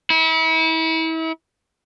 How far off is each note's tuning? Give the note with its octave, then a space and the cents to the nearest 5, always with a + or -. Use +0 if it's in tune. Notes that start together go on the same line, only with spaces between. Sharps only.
E4 -35